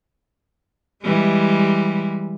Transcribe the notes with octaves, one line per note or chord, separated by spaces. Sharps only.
E3 G3 G#3